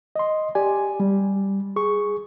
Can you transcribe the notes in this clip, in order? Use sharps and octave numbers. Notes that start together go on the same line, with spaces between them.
D#5 C6
G4 D5 G#5
G3
G#4 C#6